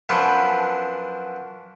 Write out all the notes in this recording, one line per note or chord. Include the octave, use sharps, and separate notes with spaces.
F#2 E3 F3 B3 D4